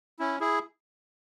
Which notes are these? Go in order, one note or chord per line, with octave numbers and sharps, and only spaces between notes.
C#4 E4
E4 G#4